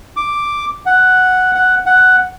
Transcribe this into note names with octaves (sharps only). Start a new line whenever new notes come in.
D6
F#5
F#5
F#5